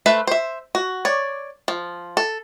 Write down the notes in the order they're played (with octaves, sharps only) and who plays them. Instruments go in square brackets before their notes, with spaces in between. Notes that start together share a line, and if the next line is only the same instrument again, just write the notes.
[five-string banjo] A3 B4 C5 E5
C5 E5
F#4
C#5 D5
F3
A4